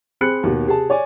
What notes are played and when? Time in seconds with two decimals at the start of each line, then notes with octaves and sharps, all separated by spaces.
0.21 C4 G#4 B5 F#6 C#7
0.43 D#2 B2
0.67 C3 G#4 A5
0.90 C#5 D5 G#5